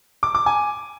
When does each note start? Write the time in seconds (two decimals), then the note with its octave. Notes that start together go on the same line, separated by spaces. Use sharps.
0.23 D6
0.35 D6
0.46 G#5